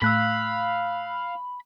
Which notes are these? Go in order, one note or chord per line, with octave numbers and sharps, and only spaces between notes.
A2 A3 F5 B5 E6 F#6 B6